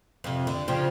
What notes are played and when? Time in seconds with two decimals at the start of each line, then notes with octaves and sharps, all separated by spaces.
0.24 F2 C3
0.47 D3
0.68 C#3 F3 G4